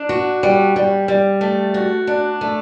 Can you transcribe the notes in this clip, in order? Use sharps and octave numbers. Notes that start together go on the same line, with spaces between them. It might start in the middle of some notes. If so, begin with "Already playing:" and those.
Already playing: D4
F#4
G3
G3
G3
A3
F#4
D4
A3